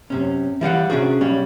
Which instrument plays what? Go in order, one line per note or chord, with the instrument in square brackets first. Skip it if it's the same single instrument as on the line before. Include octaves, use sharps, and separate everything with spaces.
[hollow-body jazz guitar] F#2 C3 C#4
E3 G3 F5 F#5
C3 C#4 D4 F#4 G#4
B1 G3 C#4